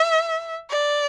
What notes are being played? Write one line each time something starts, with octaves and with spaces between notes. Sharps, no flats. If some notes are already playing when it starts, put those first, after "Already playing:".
Already playing: E5
D5